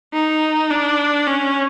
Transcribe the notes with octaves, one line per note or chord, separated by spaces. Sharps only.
D#4
D4
C#4